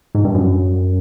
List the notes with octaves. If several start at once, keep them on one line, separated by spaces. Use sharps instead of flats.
G#2
G2
F#2